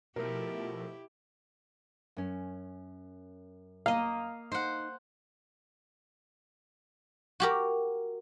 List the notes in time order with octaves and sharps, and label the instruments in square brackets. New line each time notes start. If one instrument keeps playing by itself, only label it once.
[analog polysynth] B2 F3 A3 [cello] E4 G4 [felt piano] A#4
[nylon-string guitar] F#2 C#4
[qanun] A#3 D#5 [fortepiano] F5
[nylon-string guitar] D#4 [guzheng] C5 F#5
[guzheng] F#4 G4 A#4